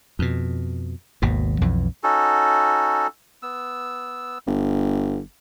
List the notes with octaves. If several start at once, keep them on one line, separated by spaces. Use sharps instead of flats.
F2 B2
G#1 D#2 B2
B1 F2 E3
C#4 D#4 F#4 A4
B3 E6
G1